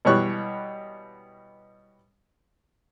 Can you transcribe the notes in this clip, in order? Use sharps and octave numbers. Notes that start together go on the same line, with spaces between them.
B2 E3 G3 C#5 C#6 F#6